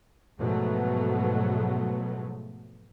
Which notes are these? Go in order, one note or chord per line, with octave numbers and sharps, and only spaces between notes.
G#2 B2 F3 F#3 A3 B3